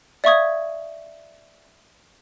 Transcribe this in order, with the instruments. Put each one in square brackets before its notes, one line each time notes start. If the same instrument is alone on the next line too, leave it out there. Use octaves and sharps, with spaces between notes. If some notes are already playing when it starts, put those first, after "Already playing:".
[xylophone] D5 E5 F5 C#6 D#6 G#6